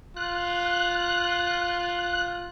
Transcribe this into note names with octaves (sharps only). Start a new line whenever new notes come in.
F4 F#6